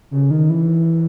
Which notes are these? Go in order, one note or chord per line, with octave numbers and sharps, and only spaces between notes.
C#3
D#3
E3